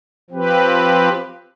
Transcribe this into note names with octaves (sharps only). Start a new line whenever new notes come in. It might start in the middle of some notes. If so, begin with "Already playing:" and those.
F3 C4 G4 B4